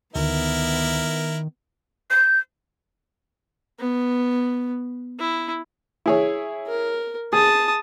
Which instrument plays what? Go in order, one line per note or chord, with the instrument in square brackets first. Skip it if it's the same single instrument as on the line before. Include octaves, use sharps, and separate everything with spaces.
[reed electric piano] D2 [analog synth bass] D#3 [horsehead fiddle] B3 [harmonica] E4 A#4
[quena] G6
[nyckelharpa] B3
E4
[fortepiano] E4 G#4 C#5
[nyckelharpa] A#4
[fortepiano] G#4 [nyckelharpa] A5 D#6